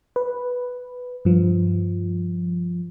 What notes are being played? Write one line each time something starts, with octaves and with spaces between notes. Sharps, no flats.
B4
G2 F3